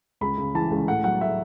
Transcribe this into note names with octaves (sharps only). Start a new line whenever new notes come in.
C#2 B5
C#3
E3 A5
C#2
A2 F#5
F#3 F#5
A3 E5